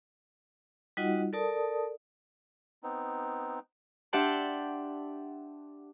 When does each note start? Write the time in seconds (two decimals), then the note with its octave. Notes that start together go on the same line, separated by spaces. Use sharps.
0.97 G3 D#4 F4 F#4 D#5 F#5
1.33 A4 A#4 D5 A5 D#6
2.83 B3 C4 D#4
4.13 D4 G4 E5 F#5 A5 C6